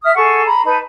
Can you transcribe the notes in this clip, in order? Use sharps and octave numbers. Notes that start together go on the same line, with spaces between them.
E5 D#6 F6
G#4 A4 F#5 C#6
A#5 B5
D#4 B4 A5 B5